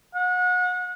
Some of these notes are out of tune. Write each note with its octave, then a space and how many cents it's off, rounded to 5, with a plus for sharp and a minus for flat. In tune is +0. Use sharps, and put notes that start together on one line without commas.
F#5 -35